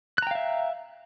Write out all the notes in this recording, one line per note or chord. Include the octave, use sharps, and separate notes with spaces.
E5 F5 G5 A#5 F#6